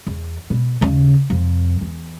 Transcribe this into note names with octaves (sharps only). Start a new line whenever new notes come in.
E2
B2
D#2 C#3
F2 C3
E2